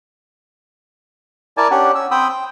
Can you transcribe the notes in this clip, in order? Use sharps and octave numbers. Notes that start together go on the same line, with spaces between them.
E4 A#4 D5 G#5 A5
C#4 D4 G4 F#5
C#4 E6
C4 G5 B5 D#6 E6
G5